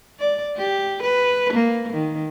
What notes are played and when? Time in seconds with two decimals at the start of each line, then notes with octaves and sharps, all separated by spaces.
0.20 D5
0.57 G4
1.03 B4
1.53 A#3
1.93 D#3